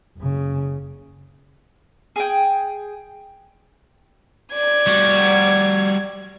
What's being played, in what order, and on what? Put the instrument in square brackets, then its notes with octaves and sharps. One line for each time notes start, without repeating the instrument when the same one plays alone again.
[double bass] F#1 C#3
[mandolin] G#4 G5
[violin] D5 G#6
[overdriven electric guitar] G3 F#4